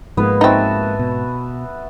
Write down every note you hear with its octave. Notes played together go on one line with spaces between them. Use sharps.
G#2 F3 G#3 A#3 B3 B4
C4 D#4 F#4 E5 A5
B2